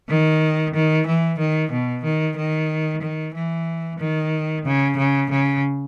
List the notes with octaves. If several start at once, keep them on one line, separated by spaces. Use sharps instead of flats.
D#3
D#3
E3
D#3
B2
D#3
D#3
D#3
E3
D#3
C#3
C#3
C#3